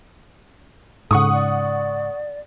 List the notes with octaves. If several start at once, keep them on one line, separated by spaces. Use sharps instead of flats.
G#2 C#3 A4 F#5 C#6 D#6
D5